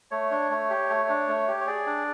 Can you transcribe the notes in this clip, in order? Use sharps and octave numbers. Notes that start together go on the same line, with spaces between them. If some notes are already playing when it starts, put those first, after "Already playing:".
A3 C#5
D4
A3
G4
A3
D4
A3
G4
C#5
G#4 D5
D4